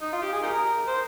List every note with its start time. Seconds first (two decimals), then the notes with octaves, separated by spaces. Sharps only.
0.02 D#4
0.13 F4
0.22 G4
0.33 G#4
0.43 D#4 G4 A#4
0.87 C5